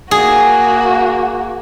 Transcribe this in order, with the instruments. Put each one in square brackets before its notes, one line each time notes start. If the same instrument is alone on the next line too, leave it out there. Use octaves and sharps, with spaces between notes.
[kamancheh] A#3 F#4 [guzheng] G#4